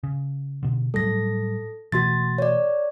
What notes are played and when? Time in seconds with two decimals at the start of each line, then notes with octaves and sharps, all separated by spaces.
0.03 C#3
0.63 B2 D3
0.94 A2 F#3 G3 A4 A#6
1.92 B2 E3 A3 F#4 C6 A6
2.38 C#5 D5